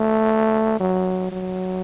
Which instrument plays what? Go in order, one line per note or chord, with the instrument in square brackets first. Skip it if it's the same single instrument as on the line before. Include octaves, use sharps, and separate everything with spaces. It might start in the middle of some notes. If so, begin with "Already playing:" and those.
Already playing: [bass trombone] A3
F#3
F#3